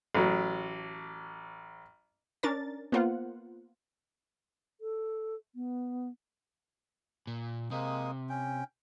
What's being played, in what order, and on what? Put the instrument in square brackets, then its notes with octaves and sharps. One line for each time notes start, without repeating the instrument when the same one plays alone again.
[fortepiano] A1 F#3
[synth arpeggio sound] C#4 D4 A#4 A6
A#3 B3 F4 C5 F#5
[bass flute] A4
B3
[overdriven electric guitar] A#2
[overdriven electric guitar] C3 [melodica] G#3 A#3 D#6
[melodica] C#4 G5